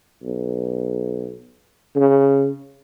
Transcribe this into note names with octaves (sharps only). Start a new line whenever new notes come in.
B1
C#3